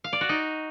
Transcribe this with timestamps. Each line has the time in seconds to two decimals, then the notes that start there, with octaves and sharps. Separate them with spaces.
0.04 F5
0.13 D5
0.21 F#4
0.29 D#4